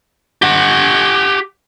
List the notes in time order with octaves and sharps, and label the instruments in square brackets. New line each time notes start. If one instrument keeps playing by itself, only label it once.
[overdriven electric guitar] G4 F#5